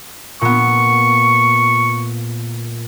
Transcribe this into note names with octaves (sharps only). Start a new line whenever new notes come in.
A#2 B3 C#6